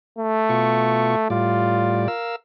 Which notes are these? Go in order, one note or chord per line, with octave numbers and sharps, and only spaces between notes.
A3
B2 F4 C#6
A2 G3 F4 D5
A#4 F5 E6